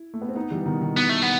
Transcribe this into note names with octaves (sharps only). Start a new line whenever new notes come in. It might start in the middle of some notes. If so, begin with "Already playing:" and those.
Already playing: E4
A3
B3
C4
B3 D#4
E3 G3
E3
B2 D#3
B2 D#3
B2 D#3 B3
A3
B3